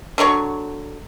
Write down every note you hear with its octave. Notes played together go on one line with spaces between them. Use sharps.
D3 F#3 C#5 C#6